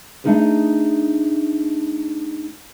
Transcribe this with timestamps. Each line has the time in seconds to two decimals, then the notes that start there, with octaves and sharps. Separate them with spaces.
0.24 A3 A#3 D4 D#4 G#4 B4